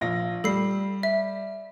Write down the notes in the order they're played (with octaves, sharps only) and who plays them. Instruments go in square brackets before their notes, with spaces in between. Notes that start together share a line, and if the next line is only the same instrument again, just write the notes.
[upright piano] A#1 F4 A#6
[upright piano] G3 [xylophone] A4 C7
[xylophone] E5